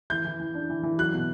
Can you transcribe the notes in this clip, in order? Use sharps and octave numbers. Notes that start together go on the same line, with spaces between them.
E3 G6
E3
E3
D4
E3
E3
F#3 F#6
B2